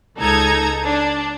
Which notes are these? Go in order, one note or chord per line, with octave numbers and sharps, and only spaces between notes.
C#2 D#4 A4 A#5 G#6
D4